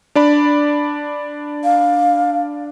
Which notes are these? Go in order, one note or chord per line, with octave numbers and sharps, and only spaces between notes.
D4 D5 B5
F5